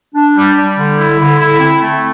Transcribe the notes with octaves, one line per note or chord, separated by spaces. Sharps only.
D4
G3
G3
D3
E4
D3
E4
C4
A3